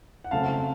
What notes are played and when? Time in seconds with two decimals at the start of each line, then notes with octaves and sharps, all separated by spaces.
0.24 F#5
0.31 F#2 C#3 A3 C4 F5 A5